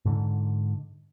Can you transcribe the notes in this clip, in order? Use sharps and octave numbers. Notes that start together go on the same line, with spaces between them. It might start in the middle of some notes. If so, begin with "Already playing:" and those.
G#2 D3